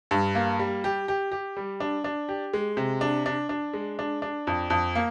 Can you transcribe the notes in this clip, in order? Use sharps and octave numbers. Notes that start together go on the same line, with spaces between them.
G2
A#3
G3
G4
G4
G4
G3
D4
D4
G4
G#3
C3
D4
D4
D4
G#3
D4
D4
F2
F2
A#3